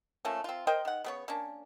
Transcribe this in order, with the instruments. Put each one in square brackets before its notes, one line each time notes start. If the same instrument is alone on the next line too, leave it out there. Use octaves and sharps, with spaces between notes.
[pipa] F3 A3 A#3 C#4
C4 F4
A#4 C5 D#5 G5
D#3 F#5
C#3 B3 C#5
A#3 C#4 D4